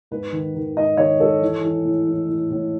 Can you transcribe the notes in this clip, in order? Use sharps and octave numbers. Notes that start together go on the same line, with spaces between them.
G#2 B4
D#3
D#3
G#2 D#5
D#3 C#5
G#2 A4
E3
E3
A2
E3
A2
A2